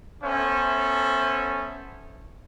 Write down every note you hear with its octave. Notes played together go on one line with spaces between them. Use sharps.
B3 C#4 A4 C5 C#5 E5